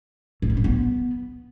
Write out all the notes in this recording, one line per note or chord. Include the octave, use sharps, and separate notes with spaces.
A2
G3
A2
B3